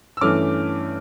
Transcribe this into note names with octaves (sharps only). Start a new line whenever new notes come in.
E6
G2 E3 A3 C#4 D6 F6